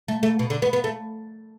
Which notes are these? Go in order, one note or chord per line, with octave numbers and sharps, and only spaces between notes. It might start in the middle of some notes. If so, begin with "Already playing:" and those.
A3
A3
B2
D3
B3
B3
A3